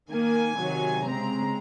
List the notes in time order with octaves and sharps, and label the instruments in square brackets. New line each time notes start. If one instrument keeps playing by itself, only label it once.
[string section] D#3 A#3 G#5
C3 D#3 F#3
C#3 G#3 C4 A#5